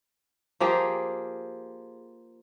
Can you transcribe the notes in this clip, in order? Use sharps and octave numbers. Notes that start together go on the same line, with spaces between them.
F3 A#3 G4 G#4